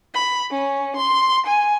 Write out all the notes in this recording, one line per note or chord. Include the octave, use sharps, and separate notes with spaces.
B5
C#4
C6
G#5